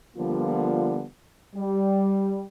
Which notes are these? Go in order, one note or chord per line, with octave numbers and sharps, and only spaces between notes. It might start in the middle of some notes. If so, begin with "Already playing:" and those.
D3 F3 G3 A#3 B3 F4
G3